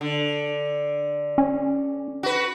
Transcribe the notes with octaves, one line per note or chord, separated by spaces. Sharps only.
D3
C#4
F#4 B4